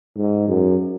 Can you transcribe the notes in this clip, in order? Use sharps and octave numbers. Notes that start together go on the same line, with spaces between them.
G#2
F#2